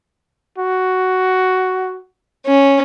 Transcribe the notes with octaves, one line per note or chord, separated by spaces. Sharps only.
F#4
C#4